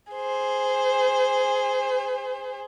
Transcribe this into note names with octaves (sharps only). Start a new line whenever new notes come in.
G#4 C5